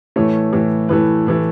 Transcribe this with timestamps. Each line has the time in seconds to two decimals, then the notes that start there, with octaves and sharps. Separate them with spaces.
0.16 A2 E3 A3 C#5
0.53 A2 E3 A3
0.89 A2 E3 A3 B4
1.26 A2 E3 A3